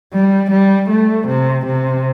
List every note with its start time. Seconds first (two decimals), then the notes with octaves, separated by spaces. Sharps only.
0.13 G3
0.51 G3
0.90 A3
1.28 C3
1.66 C3